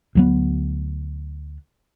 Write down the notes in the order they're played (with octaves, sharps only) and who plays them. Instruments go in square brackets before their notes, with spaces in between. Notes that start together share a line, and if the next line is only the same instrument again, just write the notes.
[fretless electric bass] D2 F#3 B3